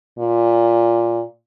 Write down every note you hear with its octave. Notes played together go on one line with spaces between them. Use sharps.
A#2